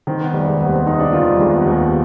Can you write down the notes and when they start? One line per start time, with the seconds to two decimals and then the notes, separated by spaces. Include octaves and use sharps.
0.07 D#3 C4
0.21 B3
0.33 F1 G3
0.48 G#3
0.60 D#2 B3
0.73 C4
0.86 F1 D#4
0.99 D4
1.13 D#3 F4
1.26 G3
1.39 F1 G#3
1.54 B3
1.66 D#2